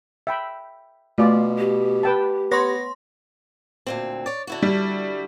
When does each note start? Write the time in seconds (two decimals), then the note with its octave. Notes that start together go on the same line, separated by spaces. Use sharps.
0.27 E5 G5 B5
1.18 B2 A3 F4 D5
1.58 G4
2.03 B4 G5 A5
2.52 B3 C#5 C6 A#6
3.87 D2 A#2 C4
4.26 C#5 D5
4.47 D3 E4 F#4
4.63 G3